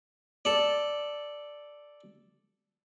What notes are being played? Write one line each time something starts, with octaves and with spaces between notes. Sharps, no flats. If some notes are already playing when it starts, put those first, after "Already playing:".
A4 D5